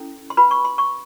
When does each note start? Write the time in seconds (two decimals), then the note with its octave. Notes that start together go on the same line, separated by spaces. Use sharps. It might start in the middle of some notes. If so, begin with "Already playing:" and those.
Already playing: C#4 E4 A4
0.30 C6
0.37 F#4 B4 B5
0.51 C#6
0.65 C6
0.78 C#6